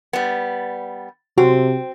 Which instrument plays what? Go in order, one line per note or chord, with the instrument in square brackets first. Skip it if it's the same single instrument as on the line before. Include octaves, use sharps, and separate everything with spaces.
[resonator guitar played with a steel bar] G3 B3
[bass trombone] C3 [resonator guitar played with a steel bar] C4 [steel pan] F#4